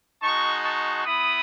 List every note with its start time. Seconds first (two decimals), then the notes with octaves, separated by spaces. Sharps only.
0.22 G#3 D#4 F#4 A5 C#6
0.63 A5 C#6
1.05 B3 E4 B5 D#6